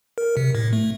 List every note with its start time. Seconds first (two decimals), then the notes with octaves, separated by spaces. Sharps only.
0.18 A#4
0.37 C3
0.55 A2
0.73 A3